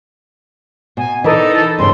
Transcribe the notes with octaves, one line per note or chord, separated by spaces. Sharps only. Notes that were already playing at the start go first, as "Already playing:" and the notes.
B2 G#5
E3 D#4 A4 A#4 D5 D#5
E2 G2 C#3 C6